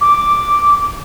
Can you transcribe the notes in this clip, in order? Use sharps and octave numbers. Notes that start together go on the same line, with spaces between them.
D6